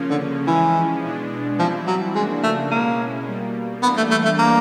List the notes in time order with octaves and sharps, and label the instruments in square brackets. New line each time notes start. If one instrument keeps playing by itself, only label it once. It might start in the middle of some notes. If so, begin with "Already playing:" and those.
Already playing: [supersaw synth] C#3 F3 A#3 C#4
[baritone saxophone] D3
[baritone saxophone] E3 [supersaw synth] F3 G#3 C#4 E4
[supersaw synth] B2 G#3 B3 D4
[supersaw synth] E3 G3 C4 E4 [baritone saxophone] F3
[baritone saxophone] F#3
[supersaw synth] C#3 F3 A#3 D4 F#4 [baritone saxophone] G#3
[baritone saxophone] A3
[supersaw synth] B2 G#3 C#4 E4 [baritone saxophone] A#3
[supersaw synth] B2 G3 A#3
[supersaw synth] E3 G3 A#3 D4 [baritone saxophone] B3
[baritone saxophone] A3
A3
A3
A#3